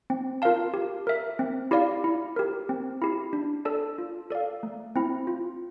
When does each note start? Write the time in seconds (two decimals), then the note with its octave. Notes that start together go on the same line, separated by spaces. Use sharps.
0.10 C4
0.42 F4 A#4 F5 A5
0.74 G4
1.07 A#4 E5
1.39 C4
1.71 E4 G4 D5 F5
2.04 E4
2.36 G4 A#4
2.69 C4
3.02 E4 G4
3.33 D4
3.65 A4 D5 A5
3.98 F4
4.30 A4 D5 F5
4.63 A3
4.96 C4 E4
5.27 F4